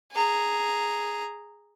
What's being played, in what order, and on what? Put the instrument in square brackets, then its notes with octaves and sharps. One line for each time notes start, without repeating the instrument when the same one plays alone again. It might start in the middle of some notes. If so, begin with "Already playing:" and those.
[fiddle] G#4 A#5